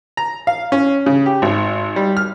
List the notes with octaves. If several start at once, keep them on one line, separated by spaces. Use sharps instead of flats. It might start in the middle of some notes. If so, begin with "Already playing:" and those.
A#5
F5
C#4
C#3
G4
G#1
G3
F6